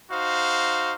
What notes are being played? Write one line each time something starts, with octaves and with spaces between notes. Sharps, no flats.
D#4 F#4 C5 F5